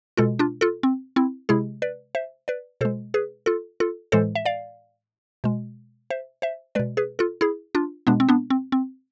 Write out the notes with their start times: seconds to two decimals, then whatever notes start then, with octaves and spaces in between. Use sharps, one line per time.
0.17 B2 G#3 F4 A4
0.39 D4 F4
0.61 F4 A4
0.83 C4
1.16 C4 E4
1.49 C3 G#3 E4 G#4
1.82 B4 D5
2.15 C5 E5
2.48 B4 D5
2.81 B2 G#3 A4 C5
3.14 G#4 B4
3.46 F4 A4
3.80 F4 A4
4.12 A2 E3 G#3 A4 C5
4.35 E5
4.45 D5 F5
5.44 B2 G#3
6.10 C5 E5
6.42 C5 E5
6.75 G#3 B4 D5
6.79 B2
6.97 G#4 B4
7.19 F4 A4
7.41 E4 G#4
7.75 D4 F4
8.07 B2 G#3 B3 D4
8.20 C4
8.29 B3 D4
8.50 C4
8.72 C4